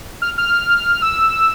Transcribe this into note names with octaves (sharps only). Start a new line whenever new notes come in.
F6
F6
E6